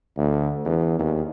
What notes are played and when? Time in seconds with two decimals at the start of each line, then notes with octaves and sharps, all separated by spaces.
0.17 D2
0.65 E2
0.99 D#2